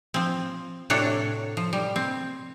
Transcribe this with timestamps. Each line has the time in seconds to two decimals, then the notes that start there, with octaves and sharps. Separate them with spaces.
0.14 F3 C4
0.90 A2 C3 D4 F#4 A4 C#5
1.57 F3
1.73 G3
1.96 C4